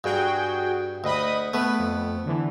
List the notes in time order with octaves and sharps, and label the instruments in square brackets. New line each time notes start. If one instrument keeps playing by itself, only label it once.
[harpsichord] G2 [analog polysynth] F#4 G#4 G5
[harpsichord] D2 [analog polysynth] D#5 B5 D#6
[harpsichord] A3 B3 [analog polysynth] B4
[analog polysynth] F2
D3 E3